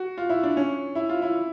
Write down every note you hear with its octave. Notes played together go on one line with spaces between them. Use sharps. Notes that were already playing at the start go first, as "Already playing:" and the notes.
Already playing: F#4
F4
E4
D4
C#4
E4
F4
E4